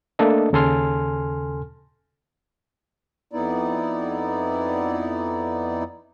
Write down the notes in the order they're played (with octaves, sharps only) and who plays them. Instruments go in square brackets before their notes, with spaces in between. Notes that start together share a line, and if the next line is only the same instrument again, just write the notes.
[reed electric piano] A3 A#3 D4 A4 D#5
D#2 C#3 A4 G#5 C6 F6
[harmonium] F2 B3 D#4 E4 D5